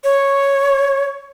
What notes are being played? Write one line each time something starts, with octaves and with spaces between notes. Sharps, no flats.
C#5